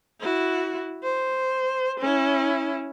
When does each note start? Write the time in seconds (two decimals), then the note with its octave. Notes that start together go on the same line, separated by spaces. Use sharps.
0.20 E4 F#4
1.04 C5
2.00 C#4 E4